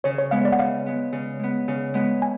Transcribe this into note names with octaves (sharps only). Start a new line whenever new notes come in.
C#3 C#5
C#5
G#3 B3 F5
D5
F#5
C#3 F5
G#3 B3
C#3
G#3 B3
C#3
G#3 B3
G#5